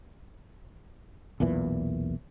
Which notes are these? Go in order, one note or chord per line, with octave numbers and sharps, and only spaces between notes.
B1 E2 A#2 E3